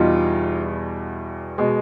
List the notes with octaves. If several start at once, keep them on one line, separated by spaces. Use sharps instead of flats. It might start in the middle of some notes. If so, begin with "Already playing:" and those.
Already playing: E2 B2 G3 D#4 F4
B2 G#3